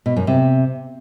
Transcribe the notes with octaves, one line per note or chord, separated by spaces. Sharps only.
B2
F#2
C3